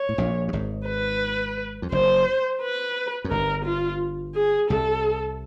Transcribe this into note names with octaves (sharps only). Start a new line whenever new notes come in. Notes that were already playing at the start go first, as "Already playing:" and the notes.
Already playing: C#5
A2
A#1 A#2
G2
G#1 G#2
B4
F2
F#1 F#2 C5
B4
F#2
G1 G2 A#4
F4
G#4
C2 C3 A4